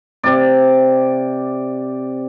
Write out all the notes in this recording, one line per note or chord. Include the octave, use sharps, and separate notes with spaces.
C3 D5